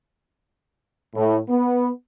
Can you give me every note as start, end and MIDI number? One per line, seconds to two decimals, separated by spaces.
1.15 1.38 45
1.49 1.88 59